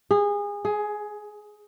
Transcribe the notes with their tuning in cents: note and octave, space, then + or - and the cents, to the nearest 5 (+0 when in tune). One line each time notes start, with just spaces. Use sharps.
G#4 -25
G#4 +15